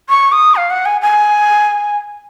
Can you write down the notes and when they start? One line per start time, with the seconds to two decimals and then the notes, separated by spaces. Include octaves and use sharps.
0.09 C#6
0.32 D#6
0.56 F5
0.70 F#5
0.85 G#5
1.01 G#5